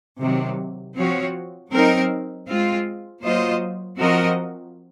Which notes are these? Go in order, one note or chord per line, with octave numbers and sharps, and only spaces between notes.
C3 D#3 F#3
F3 C4 F#4 C#5
F#3 C4 D#4 A#4
G#3 C4 F4
F#3 A#3 F4 C5 D#5
F3 C4 F#4 A#4 D#5